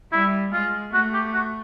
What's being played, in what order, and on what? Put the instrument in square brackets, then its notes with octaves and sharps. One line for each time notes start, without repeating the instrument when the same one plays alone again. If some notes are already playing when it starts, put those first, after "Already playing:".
[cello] G3 [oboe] E4
[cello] G#3 [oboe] F4
[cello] A3 [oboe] F#4
[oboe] G4
F#4